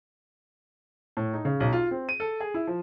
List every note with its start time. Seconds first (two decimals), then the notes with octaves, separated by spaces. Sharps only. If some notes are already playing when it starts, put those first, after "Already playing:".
1.17 A2
1.34 D#4
1.45 C#3
1.60 B1
1.73 F4
1.91 C4
2.09 D#7
2.20 A4
2.40 G#4
2.54 E4
2.67 F3